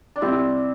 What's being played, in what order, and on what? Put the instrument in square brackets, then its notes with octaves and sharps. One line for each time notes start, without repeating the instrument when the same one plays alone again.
[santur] D4
[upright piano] C3 G3 E4 [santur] C4